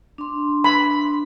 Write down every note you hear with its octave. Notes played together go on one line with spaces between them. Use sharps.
D4 C6
B5